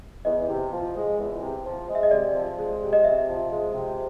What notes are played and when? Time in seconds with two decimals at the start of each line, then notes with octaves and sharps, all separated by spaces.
0.25 E2 D#5
0.48 C3
0.71 F3
0.95 G#3
1.18 E2
1.41 C3
1.64 F3
1.88 G#3
1.95 E5
2.03 D#5
2.11 C3 D5
2.34 F3
2.58 G#3
2.81 C3
2.93 D#5
3.04 C3 E5
3.28 F3
3.50 G#3
3.74 C3